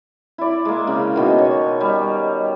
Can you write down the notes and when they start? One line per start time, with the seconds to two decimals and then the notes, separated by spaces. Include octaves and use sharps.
0.38 E4 D5
0.65 G#3 A#3
0.87 C#3
1.14 B2 D#3 B3
1.39 C#5
1.81 G3